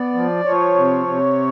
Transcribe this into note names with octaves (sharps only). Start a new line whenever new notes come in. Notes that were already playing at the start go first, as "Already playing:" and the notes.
Already playing: B3 D5
F3
F3 C#5
C3
C3